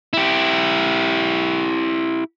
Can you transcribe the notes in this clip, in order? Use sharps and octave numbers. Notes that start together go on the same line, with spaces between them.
E4 G4